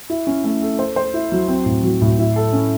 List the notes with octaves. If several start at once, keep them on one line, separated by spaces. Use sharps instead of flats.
E4
C#4
A3
A4
C5
C5
E4
F#3
C4
A2
F#3
A2
E4
A4
C#4